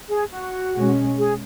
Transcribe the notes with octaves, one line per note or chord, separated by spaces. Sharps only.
G#4
F#4
B2 G#3 C#4
G#4